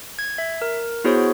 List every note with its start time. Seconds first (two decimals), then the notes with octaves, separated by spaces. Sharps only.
0.19 G#6
0.38 E5
0.62 A#4
1.04 B3 E4 F#4 G#4 C5 C#5